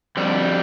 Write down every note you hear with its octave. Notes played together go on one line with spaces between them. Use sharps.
F2 D3 G3